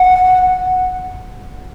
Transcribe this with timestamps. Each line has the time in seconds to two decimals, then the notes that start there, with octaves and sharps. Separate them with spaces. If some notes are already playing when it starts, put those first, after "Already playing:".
Already playing: F#5